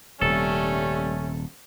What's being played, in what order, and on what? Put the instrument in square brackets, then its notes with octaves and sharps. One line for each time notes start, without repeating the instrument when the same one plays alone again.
[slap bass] D#1 C3 [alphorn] G3 [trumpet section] A3 C#4 [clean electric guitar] A4